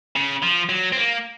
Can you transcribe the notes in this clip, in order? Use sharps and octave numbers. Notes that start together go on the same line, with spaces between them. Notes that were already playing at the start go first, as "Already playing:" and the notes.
C#3
F3
F#3
C4
A#3